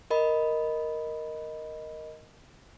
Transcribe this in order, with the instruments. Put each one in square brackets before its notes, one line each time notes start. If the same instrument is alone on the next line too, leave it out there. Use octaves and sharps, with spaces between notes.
[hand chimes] A#4 D#5 B5